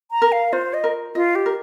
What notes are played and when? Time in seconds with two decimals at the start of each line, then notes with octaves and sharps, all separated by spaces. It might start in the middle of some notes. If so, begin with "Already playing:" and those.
0.11 A#5
0.22 A#4
0.32 F5
0.53 F4 C5
0.74 D#5
0.84 A#4
1.15 F4 D#5
1.35 G4
1.46 A#4